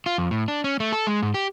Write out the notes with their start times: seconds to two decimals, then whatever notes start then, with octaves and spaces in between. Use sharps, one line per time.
0.06 F4
0.18 F2
0.31 A2
0.48 D4
0.64 C#4
0.80 A3
0.92 A4
1.07 G#3
1.23 G#2
1.34 G4